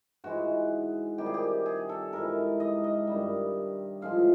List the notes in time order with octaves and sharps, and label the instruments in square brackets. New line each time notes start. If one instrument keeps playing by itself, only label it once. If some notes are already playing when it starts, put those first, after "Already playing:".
[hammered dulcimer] G#2 E3 G#3 F#4
C3 D#3 G3 G4
G#4
G4
G#4
A4
G#2 E3 G#3 A#4
D#5
D#5
G2 D#3 G3
A2 F3 G#3 F5